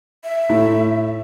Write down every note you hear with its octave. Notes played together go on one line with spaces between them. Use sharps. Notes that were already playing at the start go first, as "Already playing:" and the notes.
E5
A2